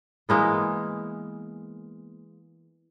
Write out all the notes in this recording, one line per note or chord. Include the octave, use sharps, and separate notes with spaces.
E3 G#3 A#3 B3